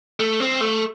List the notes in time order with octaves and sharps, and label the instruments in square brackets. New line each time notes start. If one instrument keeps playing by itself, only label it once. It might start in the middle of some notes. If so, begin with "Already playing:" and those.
[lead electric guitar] A3
C4
A3